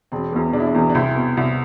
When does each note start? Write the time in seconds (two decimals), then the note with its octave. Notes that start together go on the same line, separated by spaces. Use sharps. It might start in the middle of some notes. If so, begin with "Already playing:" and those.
0.12 E1 C4
0.32 E2 B2
0.53 E1 D4
0.60 E4
0.67 D4
0.75 E2 B2
0.90 D4
0.95 C2 C4 E4
1.16 B2
1.37 C2